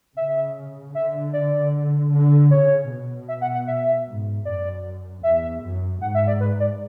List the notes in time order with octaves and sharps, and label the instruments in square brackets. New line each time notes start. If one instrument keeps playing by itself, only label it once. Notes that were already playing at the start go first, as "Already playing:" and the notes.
[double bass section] C#3 [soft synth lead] E5
[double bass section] D3 [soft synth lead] E5
[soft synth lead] D5
[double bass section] D3
[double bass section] C#3 [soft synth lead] C#5
[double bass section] B2
[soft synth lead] E5
F#5
F#5
E5
[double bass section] G#2
[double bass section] F#2 [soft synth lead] D5
[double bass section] E2 [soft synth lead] E5
[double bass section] F#2
[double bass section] G#2 [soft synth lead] F#5
[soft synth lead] E5
D5
B4
D5